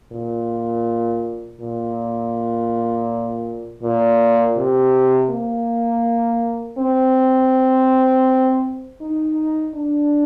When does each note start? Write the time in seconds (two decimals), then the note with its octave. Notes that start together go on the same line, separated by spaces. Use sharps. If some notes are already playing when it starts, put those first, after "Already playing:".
0.12 A#2
1.60 A#2
3.83 A#2
4.57 C3
5.30 A#3
6.78 C4
9.01 D#4
9.75 D4